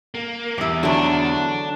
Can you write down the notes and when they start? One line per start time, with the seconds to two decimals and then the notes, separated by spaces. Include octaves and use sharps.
0.14 A#3
0.58 E2 E4 G4
0.83 D3 E3 F#3 A3 D4